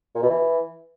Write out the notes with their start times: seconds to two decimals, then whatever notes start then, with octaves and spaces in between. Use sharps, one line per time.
0.15 A#2
0.23 B2
0.30 E3